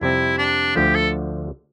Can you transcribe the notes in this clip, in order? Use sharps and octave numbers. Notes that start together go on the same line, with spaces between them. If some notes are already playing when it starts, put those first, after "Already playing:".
F2 C3 G3 C4 E4
D4
D2 D3 F3 G4
A4